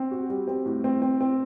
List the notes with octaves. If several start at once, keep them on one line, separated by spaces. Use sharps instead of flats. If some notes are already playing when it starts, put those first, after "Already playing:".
Already playing: C4
F#4
G3
C4
A2
C4
C4
C4